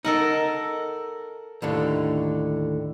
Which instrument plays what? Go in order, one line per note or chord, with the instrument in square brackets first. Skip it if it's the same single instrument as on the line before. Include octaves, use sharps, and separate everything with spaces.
[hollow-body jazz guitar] D#4 [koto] A4 A#4 F#5
[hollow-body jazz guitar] D#2 A2 D3